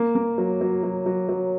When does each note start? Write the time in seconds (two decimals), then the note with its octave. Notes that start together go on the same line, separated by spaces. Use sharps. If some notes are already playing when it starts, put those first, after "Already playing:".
Already playing: A#3
0.15 A#3
0.38 F#3
0.61 F#3
0.83 F#3
1.06 F#3
1.29 F#3